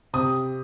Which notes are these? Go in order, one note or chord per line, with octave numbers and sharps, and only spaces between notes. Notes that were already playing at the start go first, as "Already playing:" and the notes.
C3 D#6